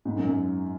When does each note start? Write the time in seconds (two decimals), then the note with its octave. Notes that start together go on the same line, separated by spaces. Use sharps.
0.05 G#2
0.16 F#2
0.26 F#2